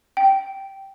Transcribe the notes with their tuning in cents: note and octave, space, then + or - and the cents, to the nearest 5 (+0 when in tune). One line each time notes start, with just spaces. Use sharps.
G5 -10